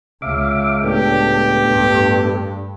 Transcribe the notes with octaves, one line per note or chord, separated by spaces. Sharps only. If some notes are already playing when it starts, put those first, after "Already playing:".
C#2 E5 F5 D6
A2 B3 D4 G4 A4
G2